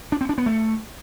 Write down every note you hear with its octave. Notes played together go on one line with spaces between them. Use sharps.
D4
C4
D4
B3
A3